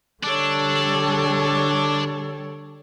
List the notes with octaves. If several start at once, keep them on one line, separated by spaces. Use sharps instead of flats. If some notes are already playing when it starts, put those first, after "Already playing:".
D3 G3 D4 A4 C#5